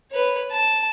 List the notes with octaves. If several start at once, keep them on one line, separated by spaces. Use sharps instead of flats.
B4 C#5
A5